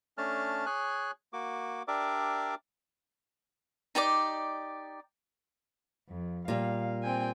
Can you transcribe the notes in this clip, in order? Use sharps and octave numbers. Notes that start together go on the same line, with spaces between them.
A3 C#4 D4 A5 F6
G#4 C#5 G#5 F#6
A#3 F#4 D6
D4 G4 A#4 D5 E5 D6
D#4 G4 D5 D6
F2
A#2 G3 F5
C4 G5 G#5